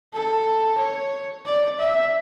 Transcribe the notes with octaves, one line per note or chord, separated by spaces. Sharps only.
A4
C#5
D5
E5